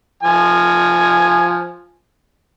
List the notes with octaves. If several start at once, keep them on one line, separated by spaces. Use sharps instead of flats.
F3 G#5